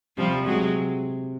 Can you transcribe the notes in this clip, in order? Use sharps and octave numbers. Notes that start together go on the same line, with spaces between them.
C3 F3 G3
C3 F#3 G#3